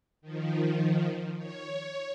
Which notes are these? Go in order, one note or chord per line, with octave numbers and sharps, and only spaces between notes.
D#3 F3
C#5